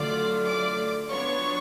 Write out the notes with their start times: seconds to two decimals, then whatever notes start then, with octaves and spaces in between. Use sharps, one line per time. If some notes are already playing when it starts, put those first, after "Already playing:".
Already playing: D3 F#3 A3 F4 D5 D6
0.45 D5 D6
1.09 F#3 B3 D4 F4 C#5 C#6